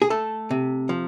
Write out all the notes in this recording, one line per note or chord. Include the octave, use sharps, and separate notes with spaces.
G#4
A3 A4
C3
F3